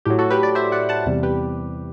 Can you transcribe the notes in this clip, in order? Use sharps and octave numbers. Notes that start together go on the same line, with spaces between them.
A2 F#3 G4
F#4 A4
G4 B4
B4 D5
C5 E5
D5 F#5
F#5 A5
E2 C3 G3
G4 B4